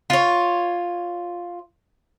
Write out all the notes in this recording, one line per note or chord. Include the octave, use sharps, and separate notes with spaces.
F4 C#5